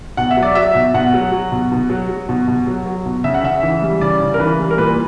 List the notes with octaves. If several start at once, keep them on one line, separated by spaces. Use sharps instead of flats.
B2 F#5
E5
F#3
D5
F#3 E5
B2
B2 F#5
F#3
F#3
B2
B2
F#3
F#3
B2
B2
F#3
F#3
B2
C#3 E5
F#5
C#3 E5
E3
G3
C#3 D5
C#3
A#4
E3 B4
G3
A#4
A#2 B4